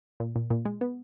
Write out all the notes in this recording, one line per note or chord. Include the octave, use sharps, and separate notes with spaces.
A#2
A#2
A#2
G#3
B3